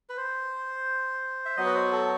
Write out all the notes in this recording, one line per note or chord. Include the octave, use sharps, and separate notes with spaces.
B4
C5
E5
F#3 B3 F#4 D#5
B4
C5
A4